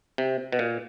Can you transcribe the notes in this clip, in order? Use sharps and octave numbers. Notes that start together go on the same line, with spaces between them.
C3
B2
A#2